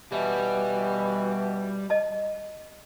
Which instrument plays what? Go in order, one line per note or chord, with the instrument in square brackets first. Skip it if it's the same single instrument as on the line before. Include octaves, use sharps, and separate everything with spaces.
[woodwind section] B2 E3 [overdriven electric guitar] G3
[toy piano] D#5 A5